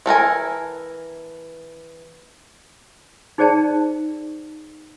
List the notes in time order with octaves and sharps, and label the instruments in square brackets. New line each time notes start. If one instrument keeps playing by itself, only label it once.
[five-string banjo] E3 A4 A#4 G#5
[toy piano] D#4 G#4 C5 D5 G5 A5